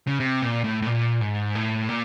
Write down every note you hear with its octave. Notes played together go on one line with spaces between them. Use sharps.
C#3
C3
A#2
A2
A2
A#2
G#2
A2
A#2